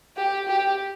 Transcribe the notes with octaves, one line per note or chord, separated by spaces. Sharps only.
G4
G4